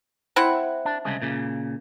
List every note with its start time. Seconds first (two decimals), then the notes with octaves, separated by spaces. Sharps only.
0.36 C4 E4 F#5
0.85 D4
1.05 C2 C#3 G#3
1.22 A#2 C#3